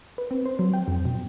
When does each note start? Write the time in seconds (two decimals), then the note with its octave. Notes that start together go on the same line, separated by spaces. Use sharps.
0.18 B4
0.31 C4
0.46 C5
0.59 F#3
0.74 G5
0.88 F2
1.05 B2